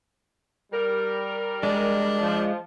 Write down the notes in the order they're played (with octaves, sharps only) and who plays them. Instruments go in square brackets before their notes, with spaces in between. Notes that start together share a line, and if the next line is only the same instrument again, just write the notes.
[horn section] G3 A#4
[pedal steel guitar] G#3 [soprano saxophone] D4
[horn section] F3